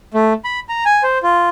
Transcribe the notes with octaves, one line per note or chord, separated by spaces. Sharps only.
A3
B5
A#5
G#5
C5
F4